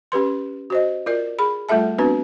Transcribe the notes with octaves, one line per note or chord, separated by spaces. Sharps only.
C#4 G4 B4 C6
F#4 C5 D#5
F4 A#4 D5
G#4 B5
G3 A3 F4 A4 E5 A5
B3 C4 D4 F#4 B4